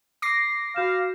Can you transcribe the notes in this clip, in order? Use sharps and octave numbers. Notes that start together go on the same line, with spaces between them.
D6 A#6 C7
F#4 F5 G6 E7